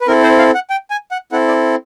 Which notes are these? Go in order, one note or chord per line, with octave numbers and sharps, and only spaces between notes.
B4
C4 E4 A4 A#4
C5
F5
F#5
G5
G#5
F#5
C4 E4 A4 F#5
D5